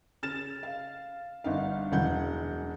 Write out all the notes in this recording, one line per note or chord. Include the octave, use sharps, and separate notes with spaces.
C#3 F6 A6 E7
F5
G1 D3 D#4 F5
E1 F#2 E3 F#5 G6